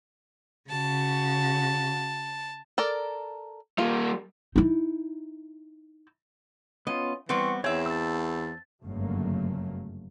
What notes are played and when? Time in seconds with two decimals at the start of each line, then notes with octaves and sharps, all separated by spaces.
0.70 C#3 F#4 A5
2.78 A4 A#4 D5
3.78 G3 A#3 F4
4.56 D#4 E4
6.87 B3 C#4 F4 D#5
7.29 E3 G3 B3 C4 F#5 C6 C#6
7.64 E2 C4 C#5 E5 G#5
7.86 A5 E6
8.84 G1 F#2 C#3 F#3 A3 A#3